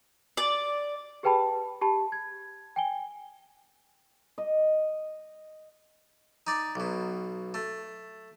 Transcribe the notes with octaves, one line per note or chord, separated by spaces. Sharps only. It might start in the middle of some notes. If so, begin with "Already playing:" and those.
D5
G4 G#4 B4 G5 A5 B5
G4 A5 B5
G#6
G5 G#5 G7
D#5
D#4 D5
B1 B2
A3